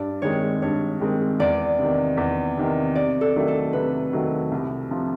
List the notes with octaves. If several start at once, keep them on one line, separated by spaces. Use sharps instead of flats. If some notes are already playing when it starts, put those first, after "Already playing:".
Already playing: G2 D5
D#3 G#3 C4 C#5
G2 C#5
D#3 G#3 C4
E2 D5
C3 D#3
E2
C3 D#3
C3 D5
A4
D#3 F#3 A3
A4
C3 B4
D#3 F#3 A3
C2
C3 F3